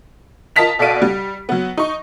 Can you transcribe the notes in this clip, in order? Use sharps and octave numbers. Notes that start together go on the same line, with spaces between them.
F4 A#4 D#5 A5 B6 F7
B2 A4 D5 F5 D7 D#7
G3
F#3 B3
D#4 C#6